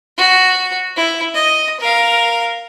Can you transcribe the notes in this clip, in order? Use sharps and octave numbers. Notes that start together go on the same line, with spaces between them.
F#4
E4
D#5
A#4 F5